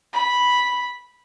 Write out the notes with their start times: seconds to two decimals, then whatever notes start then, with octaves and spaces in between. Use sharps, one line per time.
0.13 B5